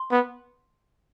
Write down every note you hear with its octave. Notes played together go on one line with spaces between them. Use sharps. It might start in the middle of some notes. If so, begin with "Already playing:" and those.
Already playing: C6
B3